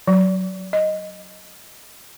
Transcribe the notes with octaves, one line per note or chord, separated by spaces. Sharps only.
F#3
D#5